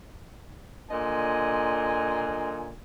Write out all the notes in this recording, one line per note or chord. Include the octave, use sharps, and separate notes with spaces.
A#2 D3 C5 D#5 G#5